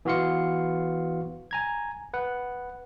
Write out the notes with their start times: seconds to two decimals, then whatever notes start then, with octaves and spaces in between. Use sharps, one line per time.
0.05 E3 B3 F#4 F5 C6 C#7
1.51 G#5 A#5 G#6
2.14 B4 F#5